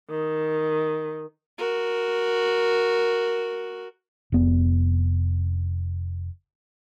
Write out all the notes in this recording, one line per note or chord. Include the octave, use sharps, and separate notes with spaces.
D#3
F#4 A#4
F1 B3